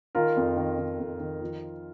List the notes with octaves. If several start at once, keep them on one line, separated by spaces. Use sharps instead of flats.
D#3 F4 A#4
F2
D#3
D#3
F2
D#3
F3